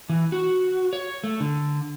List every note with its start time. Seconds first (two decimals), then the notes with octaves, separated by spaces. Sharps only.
0.09 E3
0.32 F#4
0.93 C#5
1.24 A3
1.40 D3